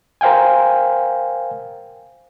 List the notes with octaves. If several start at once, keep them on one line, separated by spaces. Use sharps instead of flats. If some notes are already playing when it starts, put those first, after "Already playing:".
A#4 C5 F5 G5 G#5